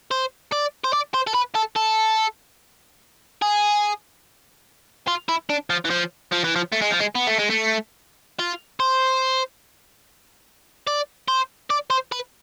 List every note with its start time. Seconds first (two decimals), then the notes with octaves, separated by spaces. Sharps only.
0.11 C5
0.52 D5
0.84 C5
0.93 D5
1.14 C5
1.27 A4
1.35 B4
1.55 A4
1.76 A4
3.42 G#4
5.08 F4
5.29 E4
5.50 D4
5.70 F3
5.85 E3
5.90 F3
6.32 F3
6.44 E3
6.56 F3
6.73 A3
6.82 G#3
6.91 F3
7.00 G#3
7.15 B3
7.27 A3
7.39 G#3
7.50 A3
8.39 F4
8.80 C5
10.87 D5
11.28 C5
11.70 D5
11.90 C5
12.12 B4